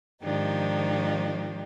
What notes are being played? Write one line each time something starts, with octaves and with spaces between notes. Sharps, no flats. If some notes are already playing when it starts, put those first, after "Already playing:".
G#2 D#3 F3 D4 D#4 G4